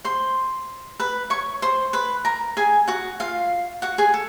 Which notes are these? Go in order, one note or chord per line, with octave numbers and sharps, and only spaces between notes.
C5 C6
B4 B5
C#5 C#6
C5 C6
B4 B5
A#4 A#5
G#4 G#5
F#4 F#5
F4 F5
F#4 F#5
G#4 G#5
A4